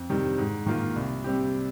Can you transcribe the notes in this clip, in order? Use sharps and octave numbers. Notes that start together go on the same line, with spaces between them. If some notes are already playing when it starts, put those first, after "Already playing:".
Already playing: F2
C3 D#3 G3
G#2
D#3 A#3 F4
C2
C3 G3 C4 G4